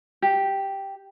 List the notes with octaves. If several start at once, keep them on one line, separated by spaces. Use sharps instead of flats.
G4